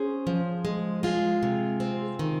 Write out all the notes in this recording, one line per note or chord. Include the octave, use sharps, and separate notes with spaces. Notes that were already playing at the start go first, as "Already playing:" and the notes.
Already playing: C#4 G#4 C5
F3
G#3
G#3 F4 G#4
C3
C4
D#3